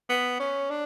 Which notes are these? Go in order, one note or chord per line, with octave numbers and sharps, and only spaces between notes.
B3
C#4
D4